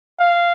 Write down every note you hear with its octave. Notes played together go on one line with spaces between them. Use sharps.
F5